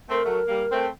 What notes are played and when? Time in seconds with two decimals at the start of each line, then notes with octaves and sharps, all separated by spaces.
0.09 A3 C4 A#4
0.25 F#3 A3
0.48 G3 A#3
0.72 A3 C4